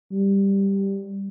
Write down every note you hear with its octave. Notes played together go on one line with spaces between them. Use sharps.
G3